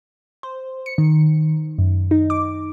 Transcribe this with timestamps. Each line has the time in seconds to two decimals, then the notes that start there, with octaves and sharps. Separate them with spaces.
0.43 C5
0.86 C#7
0.98 D#3
1.78 F#2
2.11 D#4
2.30 D6